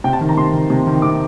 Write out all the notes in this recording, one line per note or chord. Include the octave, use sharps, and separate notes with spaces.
C3 G5
A5
D#3
A#5
C3 C6
D#3
C3
D#3
C3 D6